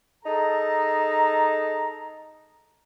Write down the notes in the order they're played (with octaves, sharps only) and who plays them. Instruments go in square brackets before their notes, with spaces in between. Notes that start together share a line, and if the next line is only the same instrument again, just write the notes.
[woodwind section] D#4 G#4 A4 A5 A#5